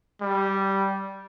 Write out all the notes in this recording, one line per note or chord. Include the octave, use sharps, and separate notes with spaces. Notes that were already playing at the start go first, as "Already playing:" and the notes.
G3